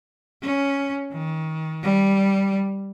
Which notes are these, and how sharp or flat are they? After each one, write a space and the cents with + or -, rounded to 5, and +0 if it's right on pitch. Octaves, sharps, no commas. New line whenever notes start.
C#4 +5
D#3 +30
G3 -5